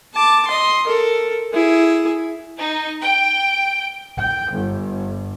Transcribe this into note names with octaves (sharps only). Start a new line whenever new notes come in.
A5 D6
D#5 C6
A4 A#4
E4 G#4
D#4
G5
G5
G1